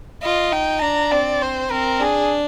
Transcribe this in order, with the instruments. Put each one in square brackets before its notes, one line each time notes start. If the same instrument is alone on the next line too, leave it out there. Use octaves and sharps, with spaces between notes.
[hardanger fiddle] F4 [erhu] D#5
[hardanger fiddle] D#4 [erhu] G5
[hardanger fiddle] D4 [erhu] A#5
[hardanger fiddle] C4 [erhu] D5
[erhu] C5
[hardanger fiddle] C4 [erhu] A#4
[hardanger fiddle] D4 [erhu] G#4